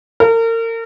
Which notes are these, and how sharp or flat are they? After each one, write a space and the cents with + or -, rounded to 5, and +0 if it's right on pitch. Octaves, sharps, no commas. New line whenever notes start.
A#4 -35